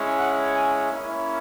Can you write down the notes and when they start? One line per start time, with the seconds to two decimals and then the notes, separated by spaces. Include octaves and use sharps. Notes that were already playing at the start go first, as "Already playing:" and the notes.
Already playing: G#3 C#4 E4
0.18 F#5
0.54 G#5
0.90 A#3 C#4 E4